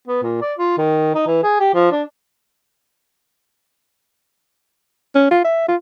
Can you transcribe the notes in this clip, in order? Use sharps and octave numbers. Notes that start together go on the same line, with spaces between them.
B3
A#2
D5
F4
D#3
D#4
E3
G#4
G4
F3
D4
C#4
F4
E5
F4